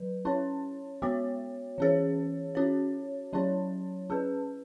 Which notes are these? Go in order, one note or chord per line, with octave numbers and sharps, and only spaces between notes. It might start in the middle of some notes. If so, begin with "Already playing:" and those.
Already playing: F#3 B4
C#4 E4 C#5
G#3 B3 F#4 C#5
E3 C#4 G#4 C#5
C#4 F#4 C#5
F#3 C#4 E4 C#5
C#4 G#4 B4